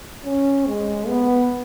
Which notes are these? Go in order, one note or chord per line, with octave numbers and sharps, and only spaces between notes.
C#4
G#3
B3